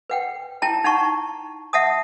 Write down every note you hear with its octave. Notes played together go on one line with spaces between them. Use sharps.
B4 F#5 G5
E4 G5 A5 A#5
D#4 F#5 A5 A#5 C#6
E5 F#5 A5 D#6